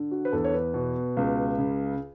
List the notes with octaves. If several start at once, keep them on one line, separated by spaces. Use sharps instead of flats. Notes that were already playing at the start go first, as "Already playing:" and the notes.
Already playing: D3
F#4
B4
E2 A4
C#5
B4
B2
C#2
C#3